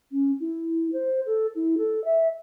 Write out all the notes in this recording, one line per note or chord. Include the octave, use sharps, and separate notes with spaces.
C#4
E4
C5
A4
E4
A4
E5